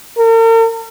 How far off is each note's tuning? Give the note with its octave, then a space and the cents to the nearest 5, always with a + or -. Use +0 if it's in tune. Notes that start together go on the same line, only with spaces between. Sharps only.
A#4 -45